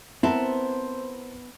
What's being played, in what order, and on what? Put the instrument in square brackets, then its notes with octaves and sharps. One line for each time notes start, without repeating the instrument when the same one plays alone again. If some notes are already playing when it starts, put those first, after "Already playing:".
[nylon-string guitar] B3 A5 [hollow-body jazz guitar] C4 A#4 [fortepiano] E4 [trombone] C5